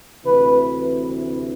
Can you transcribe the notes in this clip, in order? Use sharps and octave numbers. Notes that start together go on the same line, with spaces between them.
D2 C3 E3 B4